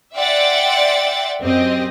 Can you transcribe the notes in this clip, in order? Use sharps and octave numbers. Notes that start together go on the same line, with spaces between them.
D5 E5 F#5 G5 C6 A6
F#2 C4 G4 D#5